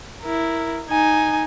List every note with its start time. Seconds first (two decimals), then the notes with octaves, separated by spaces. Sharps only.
0.21 E4 A#4
0.89 D#4 G#5